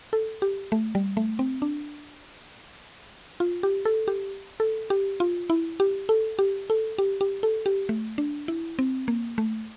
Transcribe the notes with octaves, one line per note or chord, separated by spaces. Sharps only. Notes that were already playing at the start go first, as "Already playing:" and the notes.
A4
G4
A3
G3
A3
C4
D4
F4
G4
A4
G4
A4
G4
F4
E4
G4
A4
G4
A4
G4
G4
A4
G4
A3
D4
E4
C4
A#3
A3